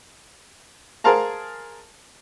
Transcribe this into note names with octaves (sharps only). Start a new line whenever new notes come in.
G#4 A#4 C5 F5 A5 A#5